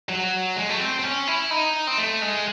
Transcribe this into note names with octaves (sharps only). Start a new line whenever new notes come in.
F#3
G#3
A3
C4
C4
C#4
E4
D#4
C4
A3
G#3